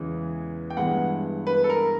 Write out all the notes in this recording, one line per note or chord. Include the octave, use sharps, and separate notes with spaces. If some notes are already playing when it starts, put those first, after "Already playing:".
Already playing: E2 C#3 E3 G#3
G5
G2 E3 G#3 B3 F#5
B4
A4
A#4